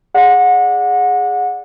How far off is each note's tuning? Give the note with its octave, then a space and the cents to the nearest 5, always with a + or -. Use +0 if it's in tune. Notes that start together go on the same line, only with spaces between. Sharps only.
G#4 +0 D5 +0 F#5 -25